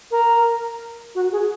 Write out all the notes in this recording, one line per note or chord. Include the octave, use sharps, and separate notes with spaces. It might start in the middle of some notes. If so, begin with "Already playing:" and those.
A#4
F#4
G#4